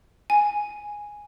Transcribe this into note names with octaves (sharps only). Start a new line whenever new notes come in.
G#5